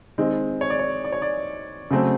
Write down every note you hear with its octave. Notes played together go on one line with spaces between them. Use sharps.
D#3 G#3 C4
C#5
D5
C#5
D5
C#5
D5
C#3 F#3 A3 C4